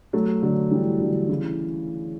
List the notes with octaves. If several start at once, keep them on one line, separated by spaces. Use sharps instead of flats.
F#3 A3
D3 F#3
E3 G3
D3 F#3
C#3 E3